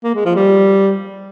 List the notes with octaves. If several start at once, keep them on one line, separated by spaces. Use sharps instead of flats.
A#3
G#3
F3
G3